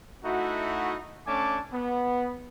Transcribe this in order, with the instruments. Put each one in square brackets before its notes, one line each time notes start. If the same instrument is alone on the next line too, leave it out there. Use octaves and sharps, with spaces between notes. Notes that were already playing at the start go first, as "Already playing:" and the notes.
[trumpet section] A3 D#4 E4 F#4
A3 C#4 D4 G#5 A5 D6
B3